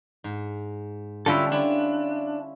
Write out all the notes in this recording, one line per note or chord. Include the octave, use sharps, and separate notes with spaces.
G#2
D3 G3 C#4 E4 F4 A4
D4 E4 F4